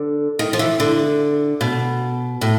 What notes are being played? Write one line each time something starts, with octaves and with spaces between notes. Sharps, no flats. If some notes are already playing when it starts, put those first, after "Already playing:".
Already playing: D3
D#3
F3
E3
D3
B2
A2